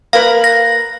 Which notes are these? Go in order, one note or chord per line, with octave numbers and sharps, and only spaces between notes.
A#3 A#4 B4 F5
A#6